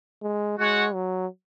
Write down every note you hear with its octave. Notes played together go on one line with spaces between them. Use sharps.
G#3
G#3 F#4 C#5 F#5
F#3